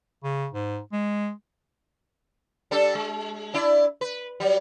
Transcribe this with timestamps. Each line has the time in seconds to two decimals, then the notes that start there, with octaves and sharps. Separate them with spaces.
0.24 C#3
0.54 G#2
0.93 G#3
2.71 G3 D4 A4
2.95 G#3
3.54 D4 E4 D5
4.01 B4
4.40 F#3 G3